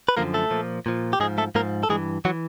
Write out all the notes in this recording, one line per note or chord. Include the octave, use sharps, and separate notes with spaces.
B4
F#2 D3 F3 A#3 A#4
A3 A4
A#2 F3
A#2 F3
G4
G#2 F3 G#3 G#4
A3 A4
G#2 F3 A#3 A#4
A4
G2 E3 G#3 G#4
E3 F#3 F#4